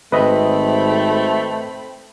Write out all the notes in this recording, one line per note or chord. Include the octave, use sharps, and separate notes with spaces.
G#1 A3 C4 B4 D#5 E5 B5